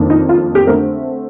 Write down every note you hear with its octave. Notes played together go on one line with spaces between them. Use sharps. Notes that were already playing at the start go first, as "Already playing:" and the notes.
Already playing: F2 D#3 A#3 D4
D#4
F4
G4
D3 A3 C4 A#4